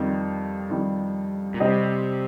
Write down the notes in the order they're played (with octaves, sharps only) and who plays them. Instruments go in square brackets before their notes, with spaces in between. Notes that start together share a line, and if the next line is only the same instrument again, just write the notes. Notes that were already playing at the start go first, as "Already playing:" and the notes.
Already playing: [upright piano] F2 D#3 G3
F2 D#3 G3
[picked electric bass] A#2
[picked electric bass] C3 [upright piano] G3 C4 G4 C5 D#5